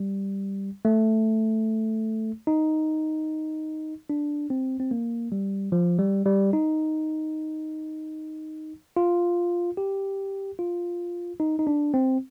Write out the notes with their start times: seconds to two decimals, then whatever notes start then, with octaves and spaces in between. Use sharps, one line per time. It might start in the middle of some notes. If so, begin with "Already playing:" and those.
Already playing: G3
0.85 A3
2.47 D#4
4.10 D4
4.50 C4
4.80 C4
4.91 A#3
5.32 G3
5.72 F3
5.99 G3
6.25 G3
6.53 D#4
8.97 F4
9.77 G4
10.59 F4
11.40 D#4
11.59 D#4
11.67 D4
11.94 C4